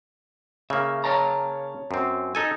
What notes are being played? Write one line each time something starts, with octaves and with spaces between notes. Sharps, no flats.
C#3 A#3 E5
C#5 A5 A#5
F#2 C4
D#4 A4 G#5